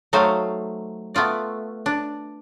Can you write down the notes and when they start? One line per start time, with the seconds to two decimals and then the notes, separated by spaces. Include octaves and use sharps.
0.13 F#3 A3 D#4 C5 F5
1.15 A3 B3 F4 D5
1.86 D4